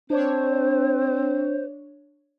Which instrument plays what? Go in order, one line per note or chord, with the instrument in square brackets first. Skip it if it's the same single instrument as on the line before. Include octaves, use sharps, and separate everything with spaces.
[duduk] C4 [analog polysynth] D4 C#5 [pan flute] C5